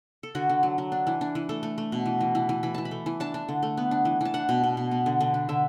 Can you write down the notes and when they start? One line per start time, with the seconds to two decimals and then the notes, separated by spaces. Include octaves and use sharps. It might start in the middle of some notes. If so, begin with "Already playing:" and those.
0.23 A4
0.35 D3 F#4
0.49 D3
0.63 F#3
0.78 F#3
0.92 D4
1.07 E3
1.21 D4
1.35 E3
1.49 A3 A4
1.63 A3
1.78 A3
1.92 B2
2.06 E3
2.21 E3
2.35 E3
2.49 E3
2.63 E3 B5
2.74 E3 A5
2.85 B5
2.91 A3
3.06 E3
3.20 D4 A5
3.34 D4
3.49 D3
3.62 A3
3.77 B3
3.91 D4
4.05 E3
4.21 E3 A5
4.34 D4 F#5
4.49 B2
4.63 B2
4.77 B2
4.91 B3
5.06 D3
5.21 D3
5.34 D4
5.49 D3 E5